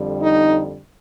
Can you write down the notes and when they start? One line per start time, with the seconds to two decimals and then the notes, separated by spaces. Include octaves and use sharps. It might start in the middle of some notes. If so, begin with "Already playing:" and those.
Already playing: F2 D3 G3
0.21 D#4